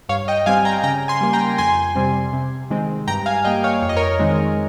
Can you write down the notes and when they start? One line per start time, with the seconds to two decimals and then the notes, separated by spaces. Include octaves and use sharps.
0.09 G2 C#5 F5
0.28 D#5 G5
0.46 G3 C4 F5 G#5
0.65 G5 A#5
0.83 C#3 G5 A#5
1.08 G#5 C6
1.21 G3 A#3
1.33 G5 A#5
1.58 F2 G#5 C6
1.95 C3 G3 C4
2.33 C3
2.70 D#3 G#3 C4
3.07 G2 G5 A#5
3.26 F5 G#5
3.45 G3 A#3 D#5 G5
3.64 C#5 F5
3.82 F2 C#5
3.89 D#5
3.97 A#4 C#5
4.19 D#3 G#3 C4